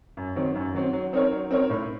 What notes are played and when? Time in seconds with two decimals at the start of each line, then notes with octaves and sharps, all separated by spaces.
0.17 F#2
0.36 D#3 F#3 C4
0.55 F#2
0.74 D#3 F#3 C4
0.93 F#3
1.13 C4 D#4 A#4 C#5
1.32 F#3
1.51 C4 D#4 A#4 C#5
1.70 A2